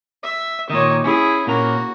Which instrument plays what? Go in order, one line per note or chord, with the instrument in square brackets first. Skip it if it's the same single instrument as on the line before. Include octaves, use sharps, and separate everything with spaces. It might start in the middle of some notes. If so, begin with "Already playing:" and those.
[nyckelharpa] E5
[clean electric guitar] A#2 D#3 [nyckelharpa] D#4 C#5
[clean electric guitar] C#4 [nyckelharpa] E4 G#4
[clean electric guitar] A#2 C#4 A#4 [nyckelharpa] A#3 F#4